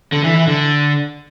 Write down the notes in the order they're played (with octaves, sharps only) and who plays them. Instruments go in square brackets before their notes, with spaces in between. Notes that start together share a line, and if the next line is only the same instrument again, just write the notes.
[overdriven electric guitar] D3
E3
E3
D3